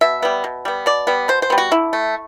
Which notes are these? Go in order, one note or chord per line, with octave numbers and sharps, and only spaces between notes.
B2 E5
G3 B3
B2
G3 B3
B2 D5
G3 B3
B2 C5
C5
G3 B3
F#4
D3 E4
A3